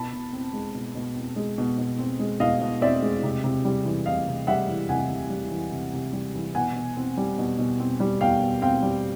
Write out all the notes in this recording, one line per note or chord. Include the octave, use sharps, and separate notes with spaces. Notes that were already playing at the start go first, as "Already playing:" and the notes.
Already playing: B2 A5 B5
B2
C4
G#3
B2
B2
C4
G#3
B2
B2
C4
G#3
B2 D#5 F5
B2
C4 D5 E5
G#3
C3
C3
G3
E3
C3 D#5 F5
C3
G3 E5 F#5
E3
C3 F#5 G#5
C3
G3
E3
C3
C3
G3
E3
B2 F#5 G#5
B2
C4
G3
B2
B2
C4
G3
B2 F5 G5
B2
C4 F5 G5
G3